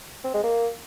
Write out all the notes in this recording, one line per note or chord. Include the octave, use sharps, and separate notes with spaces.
C4
G#3
A#3